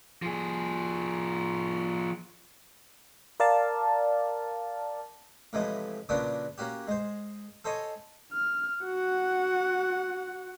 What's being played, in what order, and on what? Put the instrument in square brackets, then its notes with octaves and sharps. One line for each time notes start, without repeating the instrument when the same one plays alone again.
[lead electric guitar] F3 G#4
[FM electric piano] A#4 D5 F5 A5
[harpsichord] A2 C3 E3 F3 G#3 A3
A#2 C#3 F3 B3 D4 F#4
A#3 C#4 F#4 G4
G#3 C5
A4 C5 C#5 D#5 G#5
[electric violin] F6
F#4 F#5